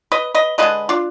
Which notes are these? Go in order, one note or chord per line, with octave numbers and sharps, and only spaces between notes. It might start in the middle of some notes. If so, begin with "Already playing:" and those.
B4 D#5
B4 D#5
D3 G#3 D4 B4 D#5
D4 F4